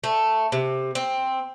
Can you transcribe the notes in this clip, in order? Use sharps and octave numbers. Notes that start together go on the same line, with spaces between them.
A3
C3
C4